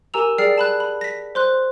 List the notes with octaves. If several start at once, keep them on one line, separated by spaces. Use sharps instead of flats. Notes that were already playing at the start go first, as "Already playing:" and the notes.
G4 A#4 G#5 A#5 E6 F7
G#4 D5 G5 F6 A6 C7
A5 B5 F#6
B5
A#6 B6
C5 C6 F#6